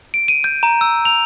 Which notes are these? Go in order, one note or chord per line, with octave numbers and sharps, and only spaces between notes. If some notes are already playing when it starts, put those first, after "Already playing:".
D7
D#7
G6
A#5
E6
F7